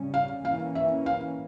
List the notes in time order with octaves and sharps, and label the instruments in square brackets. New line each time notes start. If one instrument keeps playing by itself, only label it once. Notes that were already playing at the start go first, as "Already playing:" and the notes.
Already playing: [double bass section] C#3 G3 C#4
[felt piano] F5
[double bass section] E3 A#3 C#4 [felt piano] F5
[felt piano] E5
F5